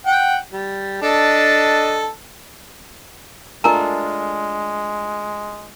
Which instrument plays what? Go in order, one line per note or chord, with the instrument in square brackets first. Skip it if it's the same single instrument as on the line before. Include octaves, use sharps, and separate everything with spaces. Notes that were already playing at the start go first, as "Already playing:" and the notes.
[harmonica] F#5 G5
G3
D4 A4 D#5
[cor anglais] G#3 [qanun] A3 D4 F4 [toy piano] A#4 G#5 A#5